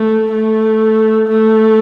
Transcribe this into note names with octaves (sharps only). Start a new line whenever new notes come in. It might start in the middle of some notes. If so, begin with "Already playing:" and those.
Already playing: A3
A3
A3